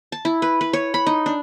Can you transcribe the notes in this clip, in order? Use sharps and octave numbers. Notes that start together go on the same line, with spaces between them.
A5
E4
B4
B4
C#5
B5
D#4
D4